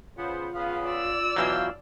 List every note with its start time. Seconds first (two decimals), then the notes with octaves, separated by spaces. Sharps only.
0.17 C#3 B3 F4 C5
0.54 C#3 B3 F5
0.87 D5 E6
1.36 B2 E3 F#3 F5 G5